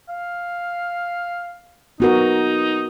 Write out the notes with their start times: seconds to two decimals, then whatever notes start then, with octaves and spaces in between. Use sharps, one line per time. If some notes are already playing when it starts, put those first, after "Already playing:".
0.09 F5
2.00 B3 D#4 F#4 A#4